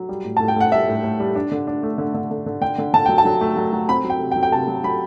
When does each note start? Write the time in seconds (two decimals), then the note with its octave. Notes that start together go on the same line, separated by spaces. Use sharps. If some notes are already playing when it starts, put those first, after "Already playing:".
Already playing: F#3
0.09 G3
0.25 A2
0.37 A2 A5
0.48 G5
0.56 A2 F#5
0.72 G3 E5
0.88 A2
1.04 A2
1.20 G3
1.35 D4
1.52 D3
1.67 D4
1.83 A3
1.98 D3
2.14 D3
2.31 D3
2.46 D3
2.61 D3 G5
2.78 D3
2.94 D3 A5
3.06 F#3 G5
3.18 A5
3.25 F#3
3.41 A3
3.57 F#3
3.73 F#3
3.89 C4 B5
4.04 F#3
4.10 G5
4.20 C3
4.31 G5
4.36 F#3
4.43 G5
4.52 C3 A5
4.68 F#3
4.83 F#3 B5